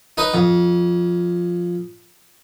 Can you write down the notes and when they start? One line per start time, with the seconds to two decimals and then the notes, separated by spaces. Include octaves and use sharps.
0.17 D#4 B4
0.34 F2